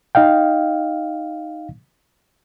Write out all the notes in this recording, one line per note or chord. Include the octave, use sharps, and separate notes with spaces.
D#4 D#5 F5 G5